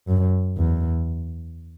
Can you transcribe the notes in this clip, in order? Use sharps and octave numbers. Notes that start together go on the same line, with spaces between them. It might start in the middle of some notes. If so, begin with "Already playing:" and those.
F#2
E2